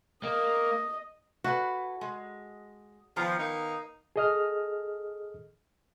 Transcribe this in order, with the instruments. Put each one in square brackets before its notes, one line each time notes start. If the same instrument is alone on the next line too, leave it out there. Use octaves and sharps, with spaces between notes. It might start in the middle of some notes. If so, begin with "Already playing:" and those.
[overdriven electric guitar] A#3 [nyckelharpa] D#5
[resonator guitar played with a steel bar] E4 A4 B4 [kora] F#4
[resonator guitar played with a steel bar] G#3
[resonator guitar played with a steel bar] D#3 B3 A#5 [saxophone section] F3
[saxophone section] A#3 D#4
[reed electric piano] G#4 A4 D#5 D#6 F6